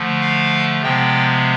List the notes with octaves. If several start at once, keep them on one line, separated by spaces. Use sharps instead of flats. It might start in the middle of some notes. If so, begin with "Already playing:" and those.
Already playing: D3 F3 A3
F5
C3 F3 G#3 B3 G5